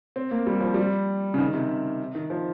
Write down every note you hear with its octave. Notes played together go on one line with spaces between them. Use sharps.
C4
A#3
G3
F3
G3
C#3
D#3
C3
D#3
F3